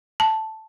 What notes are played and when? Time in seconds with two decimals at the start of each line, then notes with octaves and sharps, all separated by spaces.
0.20 A5